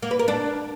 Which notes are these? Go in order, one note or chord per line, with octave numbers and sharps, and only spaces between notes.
A#3
B4
A#4
D4